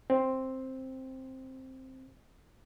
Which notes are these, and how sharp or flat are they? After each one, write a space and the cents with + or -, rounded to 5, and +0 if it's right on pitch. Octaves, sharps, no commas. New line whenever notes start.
C4 +5